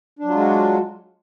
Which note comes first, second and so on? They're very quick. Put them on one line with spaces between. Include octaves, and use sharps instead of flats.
D4 F#3 F4 G#3 F#4